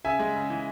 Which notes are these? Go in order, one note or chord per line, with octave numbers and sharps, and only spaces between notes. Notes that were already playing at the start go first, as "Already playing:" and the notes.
C#3 E5 G#5
G#3
C#3
E3